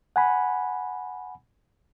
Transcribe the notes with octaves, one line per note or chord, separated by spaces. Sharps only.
F#5 G#5 B5